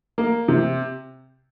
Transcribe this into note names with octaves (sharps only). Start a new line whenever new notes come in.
A#3
C3